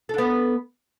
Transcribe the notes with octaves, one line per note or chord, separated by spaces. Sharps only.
B3 D4 A4